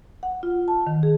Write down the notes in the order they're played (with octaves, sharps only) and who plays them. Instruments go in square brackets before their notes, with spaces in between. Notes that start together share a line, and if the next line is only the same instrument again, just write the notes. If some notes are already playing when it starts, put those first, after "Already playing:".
[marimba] F#5
F4
A5
D#3
G#4